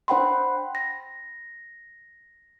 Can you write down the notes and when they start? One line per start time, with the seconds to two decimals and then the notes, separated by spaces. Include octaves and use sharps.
0.08 D4 C5 F#5 G5 B5 C6
0.75 A#6